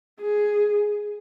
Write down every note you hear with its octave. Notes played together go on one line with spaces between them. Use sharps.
G#4